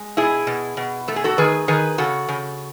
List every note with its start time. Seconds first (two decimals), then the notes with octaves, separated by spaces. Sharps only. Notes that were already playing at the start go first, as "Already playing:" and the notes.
Already playing: G#3
0.17 B2 E4 G#4
0.47 B2
0.77 B2
1.08 A3 A4
1.16 G#4
1.24 F#4 A4
1.38 D#3 G#4 B4
1.68 D#3 G#4 B4
1.98 C#3 F#4 A4
2.28 C#3